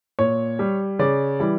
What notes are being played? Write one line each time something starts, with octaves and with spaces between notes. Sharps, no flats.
A#2 C#5
G3
C#3 D5
E3 G3